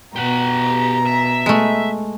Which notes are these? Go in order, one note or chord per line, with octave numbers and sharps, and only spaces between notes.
B2 G4 F#5 A#5
E5
G#3 A3